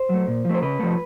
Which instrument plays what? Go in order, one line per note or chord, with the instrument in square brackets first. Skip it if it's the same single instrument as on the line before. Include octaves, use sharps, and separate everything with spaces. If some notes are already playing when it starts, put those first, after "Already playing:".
Already playing: [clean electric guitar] C5
F#3 A3
A#2
F3 A3
C5
C#3 B4
F3 A3